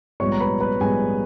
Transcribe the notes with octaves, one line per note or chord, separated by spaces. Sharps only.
A#1 G#2 G3 B3 C#5 C#6
A#5
B4 B5
B4 B5
A#1 G#2 G3 B3 G#4 G#5